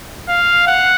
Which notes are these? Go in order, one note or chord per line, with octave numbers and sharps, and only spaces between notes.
F5
F#5